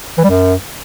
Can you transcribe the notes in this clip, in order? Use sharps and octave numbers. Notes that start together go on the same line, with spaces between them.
E3
G3
F#2